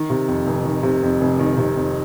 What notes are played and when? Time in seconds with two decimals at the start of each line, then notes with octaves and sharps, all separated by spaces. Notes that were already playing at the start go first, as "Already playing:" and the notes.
Already playing: D#3
0.10 C3
0.28 F2
0.46 F1
0.65 D#3
0.83 C3
1.03 F2
1.21 F1
1.39 D#3
1.58 C3
1.76 F2